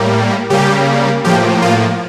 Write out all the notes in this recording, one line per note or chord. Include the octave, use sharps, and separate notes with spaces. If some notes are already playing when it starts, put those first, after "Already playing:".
Already playing: A2 G3 A#3
C#3 G3 A#3 G4
A2 F3 A#3 G4
F4